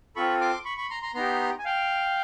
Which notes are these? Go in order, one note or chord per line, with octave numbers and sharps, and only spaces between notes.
C4 F4 A4 B5 C#6
C6 D6
B5 C#6
B5 C#6
A#5 C6
A#5 C6
B3 D#4 G4 A#5 C6
G#5
F5 G5